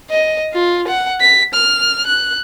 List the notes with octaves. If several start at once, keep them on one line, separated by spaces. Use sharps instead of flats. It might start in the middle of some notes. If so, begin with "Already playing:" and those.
D#5
F4
F#5
B6
F6
F#6